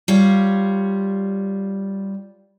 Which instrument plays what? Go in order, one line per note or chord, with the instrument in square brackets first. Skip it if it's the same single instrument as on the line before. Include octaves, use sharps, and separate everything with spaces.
[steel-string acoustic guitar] G3 F4 C#5